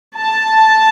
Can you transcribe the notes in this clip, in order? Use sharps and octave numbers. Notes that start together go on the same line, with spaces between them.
A5